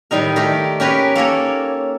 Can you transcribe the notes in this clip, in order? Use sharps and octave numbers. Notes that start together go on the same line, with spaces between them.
A2 D#3 G3 D#4 A#4
D#3 A3 G4 A#4
C#4 G4 A#4 B4 C#5
A#3 A4 A#4 C#5